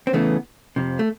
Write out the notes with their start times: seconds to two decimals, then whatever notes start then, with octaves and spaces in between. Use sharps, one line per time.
0.07 C4
0.13 E2 C#3 E3 A3 B3
0.76 F2 C3 F3
0.99 A3